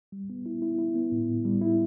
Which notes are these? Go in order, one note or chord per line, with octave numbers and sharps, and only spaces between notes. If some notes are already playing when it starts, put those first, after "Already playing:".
G3
B3
E4
E4
E4
B3
A2
A2
G3
E4